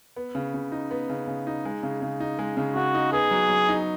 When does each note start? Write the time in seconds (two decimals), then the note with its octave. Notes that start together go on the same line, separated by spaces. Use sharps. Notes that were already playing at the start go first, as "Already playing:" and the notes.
0.16 B3
0.35 C#3
0.54 C#3
0.72 D#4
0.91 B3
1.09 C#3
1.27 C#3
1.47 D#4
1.65 G#3
1.83 C#3
2.02 C#3
2.20 D#4
2.39 G#3
2.57 C#3
2.75 C#3 F#4
2.95 D#4
3.13 B3 G#4
3.31 F#3
3.49 F#3
3.69 D#4